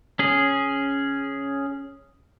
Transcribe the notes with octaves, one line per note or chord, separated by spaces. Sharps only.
C#4 G#4